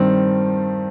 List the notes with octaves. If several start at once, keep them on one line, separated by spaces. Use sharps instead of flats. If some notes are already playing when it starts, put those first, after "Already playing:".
Already playing: G2 D#3 G3 C4